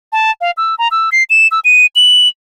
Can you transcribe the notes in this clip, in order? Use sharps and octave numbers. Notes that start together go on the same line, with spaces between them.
A5
F5
E6
A#5
E6
C7
E7
E6
D#7
F#7